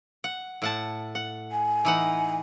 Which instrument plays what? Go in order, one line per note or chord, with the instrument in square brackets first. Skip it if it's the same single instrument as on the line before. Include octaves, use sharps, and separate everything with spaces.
[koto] F#5
A2 F#5 A5
F#5
[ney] G#5
[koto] E3 D#4 F#5